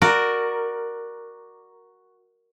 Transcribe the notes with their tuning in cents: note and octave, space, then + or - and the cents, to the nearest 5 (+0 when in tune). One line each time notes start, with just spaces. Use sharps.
F#4 +0 A#4 +0 D5 +10